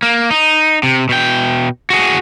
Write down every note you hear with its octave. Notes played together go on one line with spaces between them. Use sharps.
A#3
D#4
C3
B2 G5
F#4 G#4